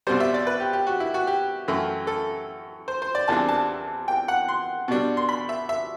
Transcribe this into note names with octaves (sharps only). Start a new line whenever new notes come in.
C2 B2 G3 C5
E5
D5
B4
G4
G4
F#4
E4
F#4
G4
F#2 E3 A3 E4
A4
C5
C5
D5
E2 C3 E3 G3 D4 A5
A5
G5
F#5
C6
B2 G3 D4
C6
B5
E5
E5